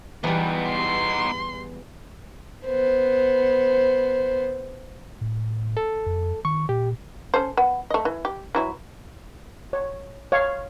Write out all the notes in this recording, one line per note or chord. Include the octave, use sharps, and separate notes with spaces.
E2 G3 B3 D#4
C6
B3 C5
A2
A4
F2
D#3 C#6
A#2 G4
C#4 A4 C5
B3
A3 D#5
E3
G4
E3 F#3 E4
C#5
C#5 F5